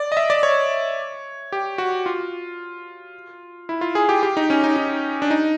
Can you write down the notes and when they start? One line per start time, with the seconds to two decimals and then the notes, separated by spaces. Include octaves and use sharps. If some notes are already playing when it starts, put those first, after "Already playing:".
Already playing: D5
0.12 D#5
0.17 E5
0.30 D5
0.43 C#5
1.52 G4
1.78 F#4
2.06 F4
3.69 E4
3.81 F4
3.95 G#4
4.09 G4
4.23 G4
4.37 D#4
4.50 C#4
4.64 D#4
4.76 D#4
5.22 D4
5.31 D#4